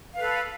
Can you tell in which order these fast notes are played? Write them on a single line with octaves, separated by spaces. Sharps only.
F5 B4 A4